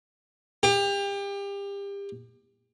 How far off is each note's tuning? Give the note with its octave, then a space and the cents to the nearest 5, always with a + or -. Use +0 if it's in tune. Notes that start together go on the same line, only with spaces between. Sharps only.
G4 +30